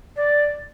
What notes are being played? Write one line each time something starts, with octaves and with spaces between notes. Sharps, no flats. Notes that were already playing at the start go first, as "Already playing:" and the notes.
D5